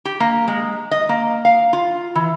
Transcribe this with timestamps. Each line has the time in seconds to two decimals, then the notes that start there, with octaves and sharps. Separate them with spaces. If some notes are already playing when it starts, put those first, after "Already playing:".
0.05 G4
0.20 A#3
0.48 G#3
0.91 D#5
1.09 A#3
1.45 F5
1.73 F4
2.15 E3